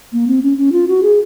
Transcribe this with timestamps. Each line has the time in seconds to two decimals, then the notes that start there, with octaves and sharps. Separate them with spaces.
0.13 A#3
0.28 C4
0.42 C#4
0.58 C#4
0.72 F4
0.88 F#4
1.03 G#4